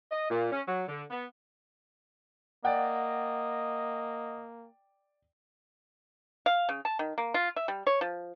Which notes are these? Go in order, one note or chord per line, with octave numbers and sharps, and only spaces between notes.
D#5
A#2
C#4
F#3
D3
B3
A#3 D5 D#5 F#5 G5
F5
C#3
A5
D#3
A#3
F4
E5
G3
C#5
F3